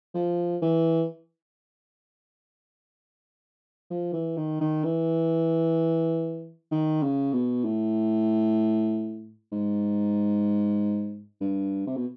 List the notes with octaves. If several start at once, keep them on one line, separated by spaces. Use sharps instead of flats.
F3
E3
F3
E3
D#3
D#3
E3
D#3
C#3
B2
A2
G#2
G2
C3
B2